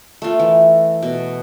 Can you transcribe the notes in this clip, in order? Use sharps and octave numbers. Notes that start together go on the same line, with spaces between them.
A3 F4
E3
B2